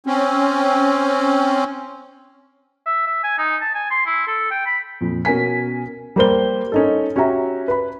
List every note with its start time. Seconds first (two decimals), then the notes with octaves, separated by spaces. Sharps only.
0.06 C4 C#4
2.86 E5
3.07 E5
3.24 G#5
3.38 D#4
3.62 A5
3.75 G#5
3.91 C6
4.06 E4
4.27 A4
4.51 G5
4.66 B5
5.01 F2 A#2
5.25 B2 C#4 A#4 G#5 B6
6.16 G3 A#3 C5 G7
6.72 C#4 D#4 A4
7.16 C#4 F#4 G4 E5 A#5
7.68 B4 B5